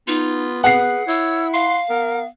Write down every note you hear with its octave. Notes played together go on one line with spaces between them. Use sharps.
B3 D#4 F4
G#4 B4 F#5 C7
E4 C#5 E6
F5 C6
B3 A#4